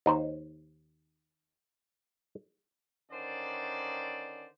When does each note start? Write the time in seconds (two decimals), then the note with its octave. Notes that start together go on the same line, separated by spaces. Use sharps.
0.06 D#2 D#4 C5
3.11 D3 D#3 C#4 C5 D5